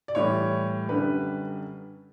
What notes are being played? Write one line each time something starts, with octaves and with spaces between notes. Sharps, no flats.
D5
A2 E3 G3 C#5
F#2 D3 G3 B4